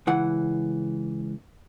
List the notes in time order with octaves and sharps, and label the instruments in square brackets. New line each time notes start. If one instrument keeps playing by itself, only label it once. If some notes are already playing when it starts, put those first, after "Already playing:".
[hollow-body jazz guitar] C#2 E3 F#5